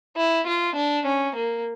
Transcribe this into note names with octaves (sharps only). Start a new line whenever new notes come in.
E4
F4
D4
C#4
A#3